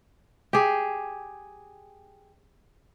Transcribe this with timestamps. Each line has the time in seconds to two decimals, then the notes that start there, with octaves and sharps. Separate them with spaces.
0.53 G4 G#4